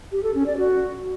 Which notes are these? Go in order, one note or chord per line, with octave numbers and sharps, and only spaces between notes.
G4
A4
C#4
D5
F#4